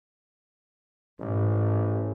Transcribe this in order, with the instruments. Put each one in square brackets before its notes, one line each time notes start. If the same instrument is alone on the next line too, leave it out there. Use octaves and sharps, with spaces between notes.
[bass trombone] A1 [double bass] G#2